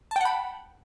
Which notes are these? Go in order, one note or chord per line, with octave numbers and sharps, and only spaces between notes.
F#5 G5 A5 B5